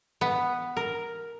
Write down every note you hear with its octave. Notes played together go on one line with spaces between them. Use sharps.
B3
A#4